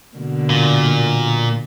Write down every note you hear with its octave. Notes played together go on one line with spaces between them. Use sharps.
B2 D3 A#3
A#2